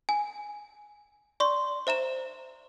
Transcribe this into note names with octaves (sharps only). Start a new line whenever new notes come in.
G#5
D5 C6 C#6
C5 E5 A#5 E7